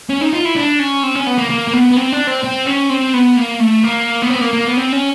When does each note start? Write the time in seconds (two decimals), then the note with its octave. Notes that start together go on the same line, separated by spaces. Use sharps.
0.09 C#4
0.21 D#4
0.33 F4
0.45 E4
0.56 D4
0.79 C#4
1.03 C4
1.15 C#4
1.27 B3
1.38 A#3
1.50 A#3
1.68 A#3
1.73 B3
1.91 B3
1.96 C4
2.12 D4
2.27 C4
2.43 C4
2.66 C#4
2.89 C4
3.14 B3
3.37 A#3
3.60 A3
3.83 A#3
4.22 B3
4.30 C4
4.36 B3
4.41 A#3
4.53 A#3
4.65 B3
4.77 C4
4.92 C#4